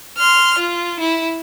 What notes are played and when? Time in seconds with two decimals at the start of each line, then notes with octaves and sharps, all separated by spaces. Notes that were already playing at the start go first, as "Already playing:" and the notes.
0.18 C6 F6
0.59 F4
1.00 E4